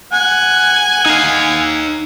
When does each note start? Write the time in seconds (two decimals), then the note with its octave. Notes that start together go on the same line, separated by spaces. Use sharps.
0.12 F#5 G#5
1.06 D#4 F5